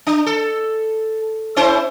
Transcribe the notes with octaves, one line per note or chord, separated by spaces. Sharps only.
D4
A4
C#4 E4 C5